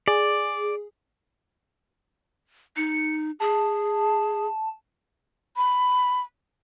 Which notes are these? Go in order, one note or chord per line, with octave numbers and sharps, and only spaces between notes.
G#4 D5
D#4 C#7
G#4 A5
B5